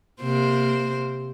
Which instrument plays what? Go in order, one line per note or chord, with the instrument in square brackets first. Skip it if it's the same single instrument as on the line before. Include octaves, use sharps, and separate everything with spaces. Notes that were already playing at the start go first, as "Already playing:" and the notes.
[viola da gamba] C3 A#3 C5